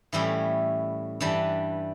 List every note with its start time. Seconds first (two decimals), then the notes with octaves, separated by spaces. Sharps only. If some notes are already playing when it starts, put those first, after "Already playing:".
0.13 A2 E3 G3 C#4 E4
1.20 G2 E3 G3 D4